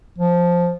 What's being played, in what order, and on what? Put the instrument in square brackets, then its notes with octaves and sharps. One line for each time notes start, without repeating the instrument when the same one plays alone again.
[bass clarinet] F3